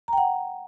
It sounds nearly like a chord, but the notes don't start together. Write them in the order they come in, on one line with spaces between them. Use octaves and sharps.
A#5 G5 F#5